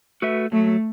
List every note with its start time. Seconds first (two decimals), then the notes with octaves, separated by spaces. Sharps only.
0.22 A3 F#4 B4 E5
0.52 F#3 A3